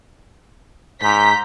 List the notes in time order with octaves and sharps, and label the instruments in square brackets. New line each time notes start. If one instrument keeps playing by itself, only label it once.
[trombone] G#2 [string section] A#5 G6 B6